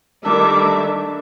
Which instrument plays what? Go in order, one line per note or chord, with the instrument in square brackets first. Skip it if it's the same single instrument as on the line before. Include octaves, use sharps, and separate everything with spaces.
[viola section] D#3 A3 E5 [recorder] G3 [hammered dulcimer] D4 [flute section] D6